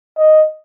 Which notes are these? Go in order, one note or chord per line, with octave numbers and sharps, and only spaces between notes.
D#5